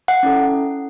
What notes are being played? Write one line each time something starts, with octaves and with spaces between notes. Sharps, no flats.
F#5
C#4 E4 A4